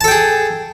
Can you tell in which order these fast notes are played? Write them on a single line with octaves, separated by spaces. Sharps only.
A5 A4 G5 G#4